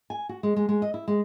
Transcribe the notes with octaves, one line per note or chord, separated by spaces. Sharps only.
G#5
F#4
G#3
G#3
G#3
D#5
E4
G#3